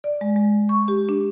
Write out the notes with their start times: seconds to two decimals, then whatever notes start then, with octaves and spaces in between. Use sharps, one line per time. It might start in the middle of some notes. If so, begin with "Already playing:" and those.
0.04 D5
0.21 G#3
0.36 G#3
0.69 C#6
0.88 G4
1.09 D4